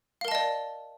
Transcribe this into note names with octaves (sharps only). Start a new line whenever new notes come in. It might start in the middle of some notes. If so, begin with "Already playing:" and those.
A#4 D5 D#5 F5 A5